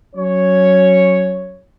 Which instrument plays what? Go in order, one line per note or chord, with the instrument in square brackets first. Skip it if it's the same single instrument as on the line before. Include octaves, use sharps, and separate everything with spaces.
[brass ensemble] F#3 C#4 C#5